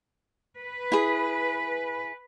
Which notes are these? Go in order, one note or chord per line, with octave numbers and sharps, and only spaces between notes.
B4
E4 G#4